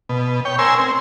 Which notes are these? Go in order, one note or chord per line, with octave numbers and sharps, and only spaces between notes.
B2
C#5 G5
A#4 C5 G#5 C6 E6
C4